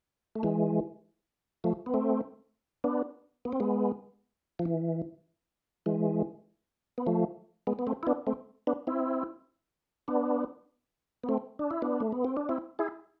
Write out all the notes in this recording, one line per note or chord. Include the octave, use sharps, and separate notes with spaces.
A3
E3 G#3
F3 A3
B3
A3 C4
B3 D4
B3
C4
G#3 B3
F3
E3
E3 G#3
B3
F3 A3
G#3 B3
B3
A3 C4
E4
B3 D4
A3 C4
B3 D4
C4 E4
B3 D4
B3
A3 C4
D4
E4
B3 D4
A3
B3
C4
D4
C4 E4
E4 G#4